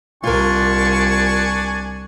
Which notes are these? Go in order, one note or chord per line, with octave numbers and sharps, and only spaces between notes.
C2 D4 F4 A#4 G#5 C#6